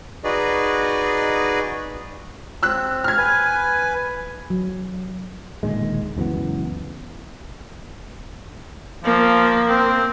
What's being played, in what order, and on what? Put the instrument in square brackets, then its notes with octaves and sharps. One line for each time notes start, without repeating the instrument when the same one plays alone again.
[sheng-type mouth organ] D#4 F#4 G#4 B4 D5 D#5
[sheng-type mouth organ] C4 [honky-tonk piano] E6 F#6
[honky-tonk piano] F6 G#6
[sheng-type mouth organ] B4 G#5
[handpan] F#3
[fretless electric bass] D1 A#2 D#3 G#3
C#2 F#2 E3 B3
[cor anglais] F3 [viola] A#3
[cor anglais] C4